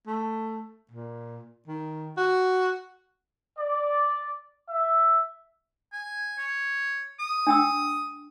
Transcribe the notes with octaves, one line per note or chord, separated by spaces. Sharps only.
A3
A#2
D#3
F#4
D5
E5
G#5
C#5
D#6
D4 G5 E6